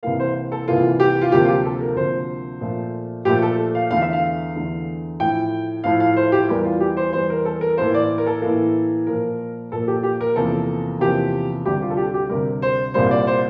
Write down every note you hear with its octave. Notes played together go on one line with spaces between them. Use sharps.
C2 C3 E3 A#3 F5
C5
A4
C2 C3 E3 A#3 F4
G4
F4
D2 C3 F3 A#3 G4
F4
G4
A4
A#4
D2 C3 F3 A#3 C5
A#2 F3 A3
A#2 F3 A3 G4
A4
F5
E2 D3 A3 F5
E5
F5
E2 D3 A3
A2 F3 A3 G5
A2 F3 A3 F5
F5
C5
G4
E2 E3 G3 A#4
F4
G4
C5
E2 E3 G3 C5
A#4
A4
A#4
A2 E3 A#3 C5
D5
A#4
A4
A2 E3 A#3
A#2 F3 A#3 A#4
A#2 F3 A#3 A4
G4
G4
A#4
E2 C3 F3 A#3 A4
E2 C3 F3 A#3 G4
D2 C3 G3 G4
F4
A4
G4
G4
D2 C3 G3 A#4
C5
C2 A#2 G3 A#3 C5
D5
C5